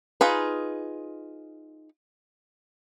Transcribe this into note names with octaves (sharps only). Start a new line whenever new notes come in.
D#4 F4 G#4 B4